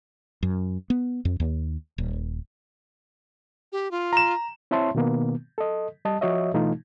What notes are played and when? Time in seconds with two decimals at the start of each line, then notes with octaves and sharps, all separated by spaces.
0.43 F#2
0.90 B3
1.25 F2
1.40 D#2
1.98 D#1
3.72 G4
3.91 F4
4.13 A#5 E7
4.71 C4 E4 C#5 E5 A5 C6
4.95 B2 D#3 A#3 B3
5.58 A4 D#5
6.05 G3 D#5 A5
6.21 F3 F#4 C#5 D#5 E5
6.54 B2 E3 A3 D#4 F4